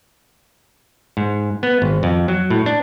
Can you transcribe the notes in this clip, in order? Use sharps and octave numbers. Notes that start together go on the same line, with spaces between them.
G#2
B3
G#1
F2
F#3
A2
D4